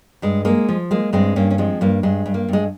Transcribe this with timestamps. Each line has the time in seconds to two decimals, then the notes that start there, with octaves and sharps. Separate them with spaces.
0.22 G2 G#3
0.45 G#3 A#3
0.69 F3
0.91 G#3 A#3
1.13 G2 G#3 C4
1.36 G2 A#3 C#4
1.50 C#4
1.58 F3 G#3 C4
1.81 G2 A#3
2.03 G2 G#3
2.26 G2
2.34 A#3
2.48 G2 G#3